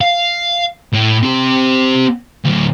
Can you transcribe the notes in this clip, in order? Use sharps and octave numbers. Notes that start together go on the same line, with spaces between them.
F5
A2
C4 G4
D2 F#3